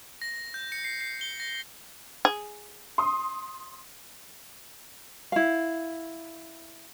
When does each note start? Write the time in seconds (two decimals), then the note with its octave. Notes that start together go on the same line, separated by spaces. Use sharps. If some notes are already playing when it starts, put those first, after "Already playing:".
0.22 A#6
0.54 G6
0.72 C#7
0.84 C7
1.01 C7
1.21 G7
1.40 A#6
2.25 G#4
2.98 C6 D#6
5.32 E4 F5